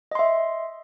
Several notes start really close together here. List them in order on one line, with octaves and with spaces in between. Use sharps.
D#5 C6 E5